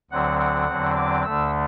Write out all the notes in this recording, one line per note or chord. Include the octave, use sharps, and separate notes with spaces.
D2 D3 F#3 C4 F#5
F#5
E2 D3 F#3 C4
D6
D2 D3 A3 E6